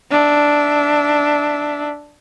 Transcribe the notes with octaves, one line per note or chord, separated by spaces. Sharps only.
D4 E5